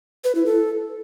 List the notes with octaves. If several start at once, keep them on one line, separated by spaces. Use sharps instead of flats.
B4
E4
A4